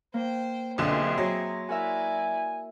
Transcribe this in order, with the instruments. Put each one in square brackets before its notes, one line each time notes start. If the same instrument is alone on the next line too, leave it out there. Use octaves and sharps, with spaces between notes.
[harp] A#3 [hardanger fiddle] C5 G5
[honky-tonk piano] B1 A#2 D3 [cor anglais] C4 [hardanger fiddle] G#4 E5
[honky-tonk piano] F#3 [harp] C#5 C6
[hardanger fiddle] E4 D5 [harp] F#4 A#4 E5 [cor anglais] G#5